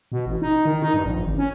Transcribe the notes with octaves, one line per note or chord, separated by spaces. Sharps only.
B2
A1
D#4
D#3
D#4
G2
A#1
G#1
C#4